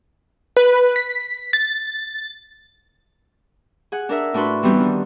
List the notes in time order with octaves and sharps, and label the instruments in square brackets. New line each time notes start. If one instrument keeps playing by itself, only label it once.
[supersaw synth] B4
B6
A6
[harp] G#4 F#5
D4 A#4 E5
A2 D4 F#4 B4 C6
E3 G3 B3 C4 D#4
D#3 D4